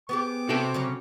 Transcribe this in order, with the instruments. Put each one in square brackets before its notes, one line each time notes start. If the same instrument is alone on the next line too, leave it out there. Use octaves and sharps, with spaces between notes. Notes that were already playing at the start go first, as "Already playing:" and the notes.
[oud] B3 G4 G#4 [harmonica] D6
[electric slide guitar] C3 [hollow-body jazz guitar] F#4 A4 G5
[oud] C#3 F#3 C#4